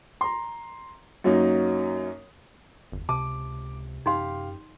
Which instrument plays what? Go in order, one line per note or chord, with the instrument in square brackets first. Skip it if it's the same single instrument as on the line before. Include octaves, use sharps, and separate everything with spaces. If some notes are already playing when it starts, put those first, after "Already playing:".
[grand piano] A#5 C6
F#2 F#3 A#3 C#4 D#4
[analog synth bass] G1 [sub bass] E2
[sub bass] C#2 [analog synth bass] C3 [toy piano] A5 [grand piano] D6
[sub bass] F#2 [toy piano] D#4 C6 [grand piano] G4 F5